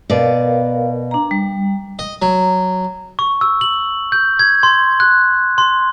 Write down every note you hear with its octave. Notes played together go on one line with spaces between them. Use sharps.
B2 A#4 D5 F5
D4 A#5
G3
D#5
F#3
C#6
E6
F#7
G6
G#6
C6
F#6
C6